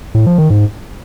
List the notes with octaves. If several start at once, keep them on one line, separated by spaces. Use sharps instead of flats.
A2
F3
D#3
G#2